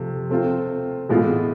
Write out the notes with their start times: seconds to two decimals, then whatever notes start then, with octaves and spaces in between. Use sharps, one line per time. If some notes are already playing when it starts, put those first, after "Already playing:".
Already playing: C3 F3 A3
0.30 A3 C4 F4
1.09 A2 E3 G#3 B3 F4